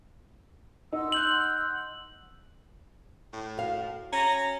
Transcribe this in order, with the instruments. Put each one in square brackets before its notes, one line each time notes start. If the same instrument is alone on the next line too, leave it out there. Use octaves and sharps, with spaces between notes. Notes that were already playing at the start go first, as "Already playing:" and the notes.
[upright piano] D#4 [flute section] F#5 C6 E6
[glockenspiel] F#6 G6 F#7
[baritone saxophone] A2
[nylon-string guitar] F#4 F5
[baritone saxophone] C#4 [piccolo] A#5